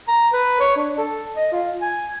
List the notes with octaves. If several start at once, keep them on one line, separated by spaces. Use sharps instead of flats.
A#5
B4
C#5
D4
A4
D#5
F4
G#5